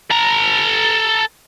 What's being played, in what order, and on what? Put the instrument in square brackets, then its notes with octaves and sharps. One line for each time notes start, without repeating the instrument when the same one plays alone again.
[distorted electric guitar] A4 A#5